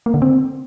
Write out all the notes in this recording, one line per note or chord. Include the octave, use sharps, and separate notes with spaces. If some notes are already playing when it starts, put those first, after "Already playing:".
A#3
D3
C4